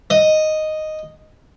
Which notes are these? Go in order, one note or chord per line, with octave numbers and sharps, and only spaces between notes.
D#5